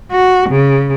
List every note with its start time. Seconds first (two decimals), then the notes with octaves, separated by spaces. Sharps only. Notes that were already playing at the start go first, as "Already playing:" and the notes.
0.11 F#4
0.50 C#3